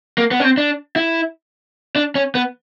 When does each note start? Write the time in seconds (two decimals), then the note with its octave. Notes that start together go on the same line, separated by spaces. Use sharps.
0.18 A#3
0.31 B3
0.40 C#4
0.44 C4
0.58 D4
0.96 E4
1.96 D4
2.15 C#4
2.35 B3